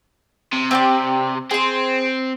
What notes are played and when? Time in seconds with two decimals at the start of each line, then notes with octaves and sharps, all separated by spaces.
0.53 C3
0.71 C4 G4 D5
1.51 C4 G#4 C6